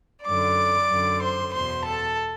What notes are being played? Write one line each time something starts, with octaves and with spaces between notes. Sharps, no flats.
F#2 D3 D5 D6
F#2 D3
C5 C6
E2 B2 C5 C6
A4 A5